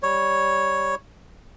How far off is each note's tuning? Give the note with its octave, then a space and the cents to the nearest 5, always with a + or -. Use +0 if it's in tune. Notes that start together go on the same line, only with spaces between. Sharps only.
G3 +0 C#5 +0